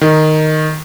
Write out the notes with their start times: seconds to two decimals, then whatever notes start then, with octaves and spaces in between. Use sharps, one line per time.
0.01 D#3